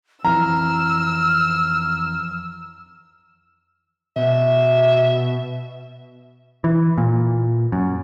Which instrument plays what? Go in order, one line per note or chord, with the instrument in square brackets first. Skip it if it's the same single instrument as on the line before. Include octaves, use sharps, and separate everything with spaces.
[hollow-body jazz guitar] F2 E3 [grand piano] A#5 [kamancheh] E6 [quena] F6
[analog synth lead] B2 [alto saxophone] E5
[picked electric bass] E3
A#2
F#2